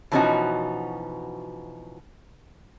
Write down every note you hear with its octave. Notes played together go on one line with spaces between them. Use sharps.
B2 E3 F3 C#4 D#4 F#4